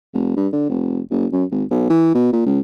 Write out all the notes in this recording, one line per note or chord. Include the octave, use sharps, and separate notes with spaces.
F1
G2
D3
F1
F#1
F#2
G#1
B1
E3
B2
A#2
C#2